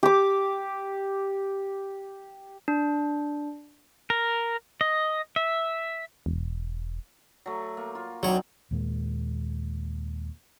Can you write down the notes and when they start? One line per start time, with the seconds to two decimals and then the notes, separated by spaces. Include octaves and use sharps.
0.03 G4 D6
2.68 D4
4.10 A#4
4.81 D#5
5.36 E5
6.26 E1
7.46 F#3 A3
7.77 A#3
7.95 F4
8.23 F#3 C4 D4 D#4 C#5
8.71 D#2 A#2 G#3 A#3